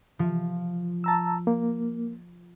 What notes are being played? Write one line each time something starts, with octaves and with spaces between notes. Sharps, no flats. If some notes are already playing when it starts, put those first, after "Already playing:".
F3
A5 A#5 E6
A#3